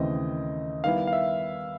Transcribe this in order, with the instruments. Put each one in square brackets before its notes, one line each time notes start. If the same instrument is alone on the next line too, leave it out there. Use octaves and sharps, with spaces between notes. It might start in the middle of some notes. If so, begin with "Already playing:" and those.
Already playing: [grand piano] D#2 C#3 E3 A3 C4 [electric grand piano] D#5
[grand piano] D#3 G3 B3 E4 [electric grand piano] F5
[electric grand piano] F5
E5